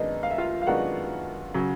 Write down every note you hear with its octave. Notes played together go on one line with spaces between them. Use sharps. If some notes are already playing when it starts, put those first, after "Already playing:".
Already playing: F#2 D#3 G#3 B3 D4 D#4 D#5
F5
E5
F4 F5
F5
F#2 D#3 G#3 B3 D4 F#4 F#5
C#3 F#3